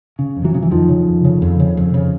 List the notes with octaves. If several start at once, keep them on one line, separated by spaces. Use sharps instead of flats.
C#3
F2
E3 F#3
C#3
E3
F2 D#3 F3
C#3
F2
C#3
F2
C#3
F2
C#3